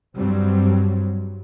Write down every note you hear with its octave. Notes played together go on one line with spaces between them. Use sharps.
G2 F#3 G3 C4